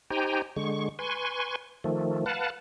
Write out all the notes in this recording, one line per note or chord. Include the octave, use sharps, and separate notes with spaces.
D#4 G4 C5 G5 G#5 A#5
D3 G#3 C#6
B4 G#5 C6 C#6
D#3 F3 A3
B4 F5 F#5 A5